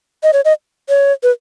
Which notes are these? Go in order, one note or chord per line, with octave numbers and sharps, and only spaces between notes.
D#5
C#5
D#5
C#5
B4